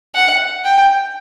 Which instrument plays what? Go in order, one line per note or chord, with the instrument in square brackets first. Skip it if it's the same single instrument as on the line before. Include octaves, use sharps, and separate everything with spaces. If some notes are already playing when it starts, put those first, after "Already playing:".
[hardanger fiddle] F#5
G5